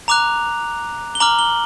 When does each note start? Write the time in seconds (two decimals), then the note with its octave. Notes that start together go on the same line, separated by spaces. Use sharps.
0.08 A#5 D6 F#6 F7
1.15 G7
1.20 A#5 D6 F6 F#7
1.39 G7